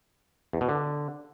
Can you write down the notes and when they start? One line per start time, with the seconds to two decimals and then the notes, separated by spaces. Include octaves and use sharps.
0.53 E2
0.61 B2
0.69 D3